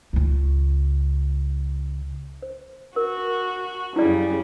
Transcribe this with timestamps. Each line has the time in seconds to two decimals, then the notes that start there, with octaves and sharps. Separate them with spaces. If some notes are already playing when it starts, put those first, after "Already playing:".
0.13 C#2 C#3
2.42 C5
2.96 F#4 A#4
3.96 F#2 C#3 G3 E4 D5